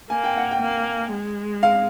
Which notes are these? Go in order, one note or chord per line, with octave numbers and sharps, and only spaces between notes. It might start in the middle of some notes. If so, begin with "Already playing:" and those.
A#3 G#5
G5
F#5
G5
A#3
G#3
F5